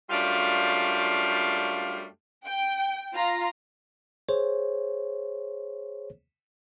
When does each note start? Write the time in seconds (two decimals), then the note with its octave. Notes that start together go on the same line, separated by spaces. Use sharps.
0.10 F#2 G3 A3 D4 F4 F5
2.45 G5
3.14 F4 A#5
4.29 G#4 C5 C#5